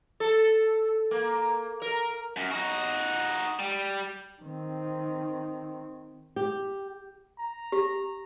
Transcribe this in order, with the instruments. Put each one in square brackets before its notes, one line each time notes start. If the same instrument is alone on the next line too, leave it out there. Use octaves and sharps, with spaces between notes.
[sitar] A4
A#3
A#4
[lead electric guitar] F#2
D#4 F#4
G3
[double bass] D#3 C4
[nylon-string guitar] G4
[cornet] A#5
[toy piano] G4